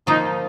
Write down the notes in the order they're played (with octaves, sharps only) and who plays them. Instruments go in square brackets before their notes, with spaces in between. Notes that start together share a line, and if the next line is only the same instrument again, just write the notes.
[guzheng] F3 A#3 F4 [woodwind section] D#4